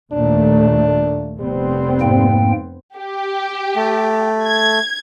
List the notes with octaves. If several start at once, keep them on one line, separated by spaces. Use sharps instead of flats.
D#2 A#2 A3 D4
F1 G3 B3 C4
G#2 A#3 G5
G4
A3
G#6